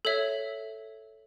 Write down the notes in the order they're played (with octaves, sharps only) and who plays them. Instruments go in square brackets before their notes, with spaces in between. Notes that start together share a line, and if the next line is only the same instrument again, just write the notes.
[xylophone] A4 C#5 E5